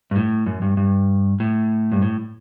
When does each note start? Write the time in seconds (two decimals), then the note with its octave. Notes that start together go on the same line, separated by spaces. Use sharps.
0.11 G2
0.15 A2
0.46 F#2
0.62 G2
0.77 G2
1.40 A2
1.92 G2
2.02 A2